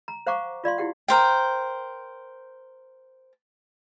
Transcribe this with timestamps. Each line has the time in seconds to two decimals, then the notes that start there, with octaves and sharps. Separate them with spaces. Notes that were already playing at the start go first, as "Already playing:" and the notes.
0.08 A#5
0.27 C5 F5 F#5 A#5 C#6 D6
0.64 F4 D5 F5 C6
0.78 E4 G4 F#5
1.08 A#4 C5 G5